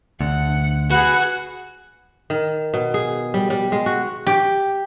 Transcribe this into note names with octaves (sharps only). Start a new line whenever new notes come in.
D2 F#5
F#4 G#4 B4 F#5
D#3
B2
G#4
G3
G3
G#3
F#4
G4